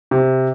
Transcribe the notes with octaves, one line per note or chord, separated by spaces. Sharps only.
C3